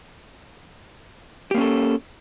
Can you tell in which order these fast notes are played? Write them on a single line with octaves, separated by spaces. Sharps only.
G4 A#3 C#4 A4